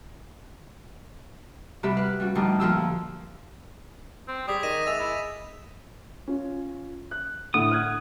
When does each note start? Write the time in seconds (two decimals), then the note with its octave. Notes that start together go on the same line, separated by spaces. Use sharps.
1.83 C3 G3 F#4 G4 E5 B5
1.97 B4 F5 F#6
2.20 G3 C#4 F#4
2.35 F2 A2 D3 G3 D#4
2.60 F2 A#2 F3 F4 G4 E6
4.28 C4
4.48 G3 G#4 D6 D#6 B6
4.63 D#3 A#6 D#7 E7
4.86 G#3 E5 A6 F7
5.00 E4
6.28 C#4 F4
7.11 F#6
7.54 A2 D3 F#5 D#6
7.71 F6 F#6 G#6